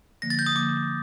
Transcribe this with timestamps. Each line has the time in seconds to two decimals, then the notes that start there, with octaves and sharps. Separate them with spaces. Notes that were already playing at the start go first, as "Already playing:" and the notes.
0.22 D3 F3 A#3 A#6
0.30 A6
0.39 G6
0.46 D#6
0.55 D3 F3 A#3 D6